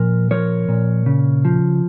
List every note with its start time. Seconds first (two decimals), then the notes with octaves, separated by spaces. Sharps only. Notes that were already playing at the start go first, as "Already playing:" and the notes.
Already playing: A#2 F3 A#4
0.31 F3 A#4 C#5
0.68 A#2
1.06 C#3
1.45 F3